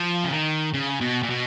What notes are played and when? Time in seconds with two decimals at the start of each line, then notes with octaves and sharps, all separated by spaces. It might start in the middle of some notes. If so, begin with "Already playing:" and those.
Already playing: F3
0.24 C#3
0.31 D#3
0.74 C#3
1.01 B2
1.23 A#2
1.30 B2